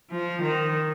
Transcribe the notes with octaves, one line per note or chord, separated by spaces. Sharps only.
F3
D#3